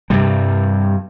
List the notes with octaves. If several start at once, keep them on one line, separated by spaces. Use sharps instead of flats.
G2 C3 G3